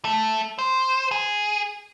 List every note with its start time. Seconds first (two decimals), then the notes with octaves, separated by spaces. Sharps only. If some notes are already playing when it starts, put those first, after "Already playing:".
0.05 A3
0.59 C5
1.11 G#4